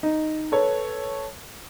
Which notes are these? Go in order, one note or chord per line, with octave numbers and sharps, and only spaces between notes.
D#4
A4 B4 C#5